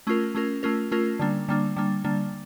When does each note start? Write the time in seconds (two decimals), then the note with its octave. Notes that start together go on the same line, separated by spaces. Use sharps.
0.07 A3 C#4 F4 A#4
0.35 A3 C#4 F4 A#4
0.63 A3 C#4 F4 A#4
0.92 A3 C#4 F4 A#4
1.19 D3 G3 A#3 D4
1.48 D3 G3 A#3 D4
1.76 D3 G3 A#3 D4
2.04 D3 G3 A#3 D4